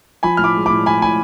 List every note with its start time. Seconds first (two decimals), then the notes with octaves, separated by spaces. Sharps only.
0.23 F3 G#5 B5
0.37 A2 F6
0.44 B5 D6
0.55 G#3
0.66 A2 B5 D6
0.86 F3 G#5 B5
1.02 A2 G#5 B5